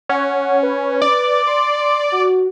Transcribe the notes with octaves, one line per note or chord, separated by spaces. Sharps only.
C#4 F#5
B4
D5
C6
F#4